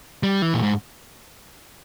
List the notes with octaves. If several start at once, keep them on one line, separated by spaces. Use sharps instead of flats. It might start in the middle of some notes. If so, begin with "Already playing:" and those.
G3
E3
A#2
G#2